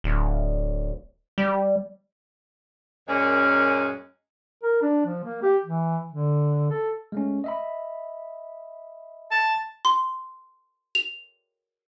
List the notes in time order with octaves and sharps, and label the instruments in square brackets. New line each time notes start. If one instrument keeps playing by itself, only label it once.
[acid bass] D1
G3
[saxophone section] F#2 A#2 G#3 C#4
[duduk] A#4
D4
F3
A#3
G4
E3
D3
A4
[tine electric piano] G#3 A3 C#4
D#5 E5 B5
[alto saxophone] A5
[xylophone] C6
F7